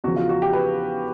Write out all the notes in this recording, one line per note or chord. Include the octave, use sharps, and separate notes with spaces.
E2 C#3 F3 F#4
F4
F#4
G4
B4